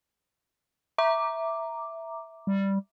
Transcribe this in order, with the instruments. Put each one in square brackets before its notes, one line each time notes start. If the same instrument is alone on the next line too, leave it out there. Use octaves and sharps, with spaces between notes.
[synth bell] E5 A#5 D6
[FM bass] G3